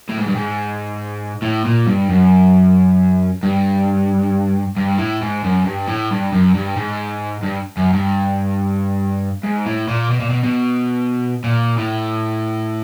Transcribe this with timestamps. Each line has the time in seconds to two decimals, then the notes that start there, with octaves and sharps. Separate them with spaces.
0.09 A2
0.18 G#2
0.27 G2
0.35 G#2
1.42 A2
1.65 A#2
1.87 G2
2.09 F#2
3.43 G2
4.77 G2
4.98 A2
5.21 G#2
5.44 F#2
5.65 G2
5.88 A2
6.10 G2
6.32 F#2
6.54 G2
6.77 G#2
7.43 G2
7.77 F#2
7.93 G2
9.44 G#2
9.66 A2
9.88 A#2
10.11 B2
10.20 A#2
10.30 B2
10.44 B2
11.44 A#2
11.77 A2